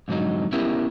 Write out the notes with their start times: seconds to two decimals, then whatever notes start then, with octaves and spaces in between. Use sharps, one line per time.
0.08 F2 G#2 D3 F#3 D#4
0.52 B3 C#4 E4 G4 A#4 E5